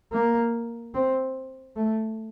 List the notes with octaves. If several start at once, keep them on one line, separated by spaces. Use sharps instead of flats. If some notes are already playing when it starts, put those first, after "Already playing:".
A#3
C4
A3